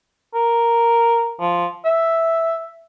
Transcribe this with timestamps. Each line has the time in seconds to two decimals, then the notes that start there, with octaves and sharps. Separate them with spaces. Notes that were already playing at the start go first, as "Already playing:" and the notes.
0.34 A#4
1.40 F3
1.85 E5